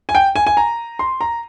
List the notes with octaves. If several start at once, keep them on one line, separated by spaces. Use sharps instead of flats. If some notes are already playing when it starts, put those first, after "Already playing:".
G#5
G5
G#5
G#5
A#5
C6
A#5